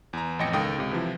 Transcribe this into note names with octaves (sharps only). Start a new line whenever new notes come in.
E2 A#5
A1 F2 D#5 G5 A#6 C#7
C#2 D#3 A4 G5 D#6
C#2 C3
C3 E3 F3 E4